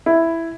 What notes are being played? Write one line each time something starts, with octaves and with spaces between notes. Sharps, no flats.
E4